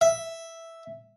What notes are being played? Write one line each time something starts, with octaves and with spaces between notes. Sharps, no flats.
E5